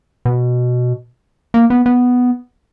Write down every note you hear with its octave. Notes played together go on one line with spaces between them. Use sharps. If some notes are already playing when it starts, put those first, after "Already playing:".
B2
A#3
B3
B3